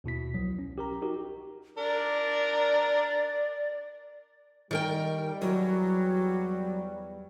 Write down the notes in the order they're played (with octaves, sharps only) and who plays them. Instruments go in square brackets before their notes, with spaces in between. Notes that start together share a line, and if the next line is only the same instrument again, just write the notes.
[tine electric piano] D#2 B2 E4 B6
C2 F3 F#3
C#4
G4 A#4 A#5
D#4 F#4 G4 A#4
[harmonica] D4 A#4 [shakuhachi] D5
[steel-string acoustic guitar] D#3 A#4 G5 [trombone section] G3
[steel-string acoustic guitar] E2 [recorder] F#3